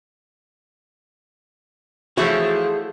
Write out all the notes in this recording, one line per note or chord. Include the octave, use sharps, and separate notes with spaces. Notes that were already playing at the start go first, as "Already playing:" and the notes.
E3 F3 A3 E4 F#4 G#4 C#5 E5